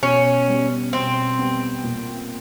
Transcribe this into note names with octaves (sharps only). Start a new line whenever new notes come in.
B2 C#4
G3 B3
B2 C4
G3 B3
A#2